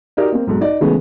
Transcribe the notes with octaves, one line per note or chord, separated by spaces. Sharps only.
D#4 F#4 G4 A#4 D5 D#5
A#3 C4
B1 G#2 A4
D#4 D5 D#5
C#3 E3 G#3 A3 B3 C#4